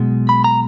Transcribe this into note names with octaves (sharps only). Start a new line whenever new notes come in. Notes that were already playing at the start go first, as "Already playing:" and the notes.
Already playing: B1 B2 G#3
B5
A#5